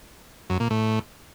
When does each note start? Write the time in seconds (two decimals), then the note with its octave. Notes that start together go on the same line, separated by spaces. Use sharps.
0.50 F#2
0.60 A#2
0.71 A2